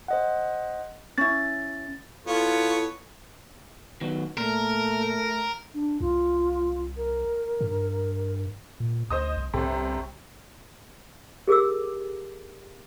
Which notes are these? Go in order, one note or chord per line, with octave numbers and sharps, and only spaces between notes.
C5 D#5 F#5
C#4 E4 A6
B3 E4 F4 A4 C#5
D#3 F#3 B3
A#2 A3 A#4
D4
C2 F4
A#4
G2
A#2
D2 C5 D#5 D#6
C2
G1 C2 C3
G4 G#4 A#4 D6 E6